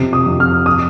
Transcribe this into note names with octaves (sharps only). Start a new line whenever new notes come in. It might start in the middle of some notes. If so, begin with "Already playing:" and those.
Already playing: F2 C3
D#6
F2
F6
D#6